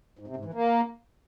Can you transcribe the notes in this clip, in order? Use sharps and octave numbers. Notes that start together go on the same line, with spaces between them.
G#2
C3
G#2
E3
A#3